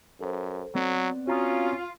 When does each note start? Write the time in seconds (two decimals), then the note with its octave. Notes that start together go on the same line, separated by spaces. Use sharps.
0.21 F#2 A4 C5
0.75 F#3 B3 C4 D5
1.27 C#4 F4 F#4 A#5 D#6